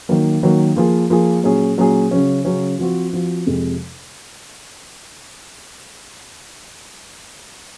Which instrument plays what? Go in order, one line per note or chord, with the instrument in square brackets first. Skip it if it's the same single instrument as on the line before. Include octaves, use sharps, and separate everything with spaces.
[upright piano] D#3 F#3 A#3
D#3 F#3 A#3
F3 A#3 F4 G#4
F3 A#3 F4 G#4
A#2 F#3 C#4 G#4
A#2 F#3 C#4 G#4
C#3 F#3 C#4
C#3 F#3 C#4
F3 C4 F#4
F3 C4 F#4
F2 C3 F3 G#3